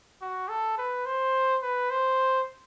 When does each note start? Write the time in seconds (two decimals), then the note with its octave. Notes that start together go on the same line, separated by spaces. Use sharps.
0.21 F#4
0.48 A4
0.78 B4
1.06 C5
1.62 B4
1.90 C5